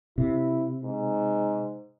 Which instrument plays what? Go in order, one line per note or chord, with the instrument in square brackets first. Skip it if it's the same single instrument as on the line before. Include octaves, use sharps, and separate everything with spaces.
[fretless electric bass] C3 [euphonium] E4
[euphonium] G#2